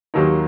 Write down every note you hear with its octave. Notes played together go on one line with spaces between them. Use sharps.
D#2 D#3 F#3 A#3 D#4